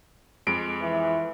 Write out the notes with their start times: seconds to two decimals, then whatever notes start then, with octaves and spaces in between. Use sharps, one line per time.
0.47 F2 G#3 D7
0.81 E3